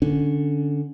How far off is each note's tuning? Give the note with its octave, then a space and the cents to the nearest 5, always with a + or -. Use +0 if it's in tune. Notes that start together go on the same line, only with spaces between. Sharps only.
D3 +0 C#4 +5